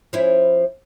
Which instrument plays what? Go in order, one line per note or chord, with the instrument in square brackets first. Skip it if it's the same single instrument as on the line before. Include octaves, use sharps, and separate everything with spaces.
[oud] F3 C#4 E4